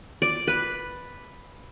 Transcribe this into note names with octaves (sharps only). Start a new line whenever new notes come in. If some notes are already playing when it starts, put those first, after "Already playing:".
D5
B4